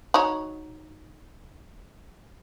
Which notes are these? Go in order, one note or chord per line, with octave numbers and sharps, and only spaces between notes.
D#4 F#4 C#5